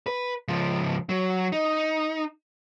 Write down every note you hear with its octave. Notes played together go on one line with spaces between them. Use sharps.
B4
C#2 F3
F#3
D#4